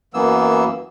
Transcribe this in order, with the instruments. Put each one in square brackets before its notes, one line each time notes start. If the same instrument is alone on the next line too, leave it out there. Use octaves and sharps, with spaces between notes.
[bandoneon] F#2 E3 A#3 B3 E6